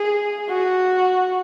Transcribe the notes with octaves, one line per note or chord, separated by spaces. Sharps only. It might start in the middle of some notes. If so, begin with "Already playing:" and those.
Already playing: G#4
F#4